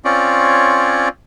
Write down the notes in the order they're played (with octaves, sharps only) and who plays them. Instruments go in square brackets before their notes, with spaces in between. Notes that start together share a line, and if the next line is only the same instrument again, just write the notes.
[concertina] C4 C#4 F4 C#5 D5